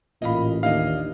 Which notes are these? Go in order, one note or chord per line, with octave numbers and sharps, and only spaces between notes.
A1 A#2 D#5 F5 B5
D#2 D4 E4 D#5 F5